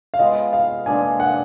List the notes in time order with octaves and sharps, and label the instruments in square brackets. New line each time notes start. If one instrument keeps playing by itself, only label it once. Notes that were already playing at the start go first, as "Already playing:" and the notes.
[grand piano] F5
[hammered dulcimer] G#3 B3 F4 [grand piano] D#5
[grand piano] F5
[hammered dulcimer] A#2 G#3 D4 F4 [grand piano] G#5
[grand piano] F#5